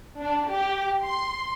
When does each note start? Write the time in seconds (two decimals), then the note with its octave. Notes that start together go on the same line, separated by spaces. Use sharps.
0.20 D4
0.50 G4
1.04 C6